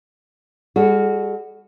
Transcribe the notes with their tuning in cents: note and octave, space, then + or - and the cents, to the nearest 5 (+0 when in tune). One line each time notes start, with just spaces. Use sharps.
G3 +35 F#4 +0 A4 -40